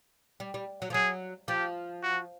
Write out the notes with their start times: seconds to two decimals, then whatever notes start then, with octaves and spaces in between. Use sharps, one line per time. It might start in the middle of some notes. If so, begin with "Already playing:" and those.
0.40 G3
0.54 G3
0.82 F#3
0.90 F3
0.94 F#3 G#4
1.48 F3 G4
2.03 F#4